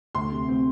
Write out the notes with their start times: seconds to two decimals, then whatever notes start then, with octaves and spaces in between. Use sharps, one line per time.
0.15 D2 C6
0.32 C3
0.48 C4